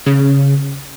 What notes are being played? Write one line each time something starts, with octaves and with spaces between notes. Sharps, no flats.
C#3